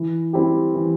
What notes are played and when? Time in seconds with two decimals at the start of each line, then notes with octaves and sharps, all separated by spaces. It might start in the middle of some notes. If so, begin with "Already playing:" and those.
Already playing: E3
0.33 G3 C4 E4 G4
0.74 E3